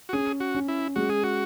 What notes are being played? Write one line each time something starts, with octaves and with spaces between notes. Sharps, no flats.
F#4
C#4 G#4
F#4
C#4
E4
G#3 F#4
G#4
F#4